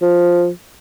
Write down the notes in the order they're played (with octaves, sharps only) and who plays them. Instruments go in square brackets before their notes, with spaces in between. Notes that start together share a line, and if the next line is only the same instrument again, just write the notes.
[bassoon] F3